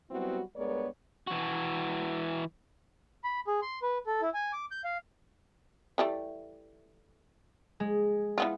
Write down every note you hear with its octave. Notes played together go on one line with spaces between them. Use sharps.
F#3 G3 B3 C4 E4 F#4
G2 G#3 B3 A#4 C#5 D5
E3 F#4
B5
G#4
C6
B4
A4
E4
G#5
D6
G6
F5
E3 G3 A3
G#3
E3 B3 F4